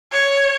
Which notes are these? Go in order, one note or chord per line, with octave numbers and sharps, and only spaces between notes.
C#5